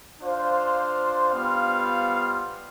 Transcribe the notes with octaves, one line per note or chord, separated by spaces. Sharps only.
D4 F4 C5 F5
G3 B3 F4 C5 F5